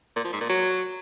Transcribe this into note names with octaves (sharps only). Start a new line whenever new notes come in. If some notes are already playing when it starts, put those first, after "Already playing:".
A#2
F3
G#2
A#2
F#3